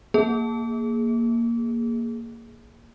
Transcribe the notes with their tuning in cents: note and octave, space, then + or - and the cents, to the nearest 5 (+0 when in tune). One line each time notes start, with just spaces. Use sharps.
A#3 +0 G#4 +0